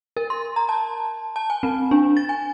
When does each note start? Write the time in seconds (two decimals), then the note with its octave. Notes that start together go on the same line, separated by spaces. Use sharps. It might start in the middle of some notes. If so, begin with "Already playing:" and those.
0.17 A#4
0.30 C6
0.56 A#5
0.69 A5
1.36 A5
1.50 G#5
1.63 C4
1.91 D4
2.17 A6
2.29 G#5